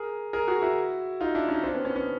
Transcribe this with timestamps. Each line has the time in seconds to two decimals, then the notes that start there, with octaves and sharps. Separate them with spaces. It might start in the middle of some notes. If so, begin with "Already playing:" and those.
Already playing: G#4 A#4
0.33 G#4 A#4
0.47 F#4 G#4
0.62 E4 F#4
1.21 D#4 F4
1.35 D4 E4
1.49 C#4 D#4
1.63 C4 D4
1.74 B3 C#4
1.85 B3 C#4
1.96 B3 C#4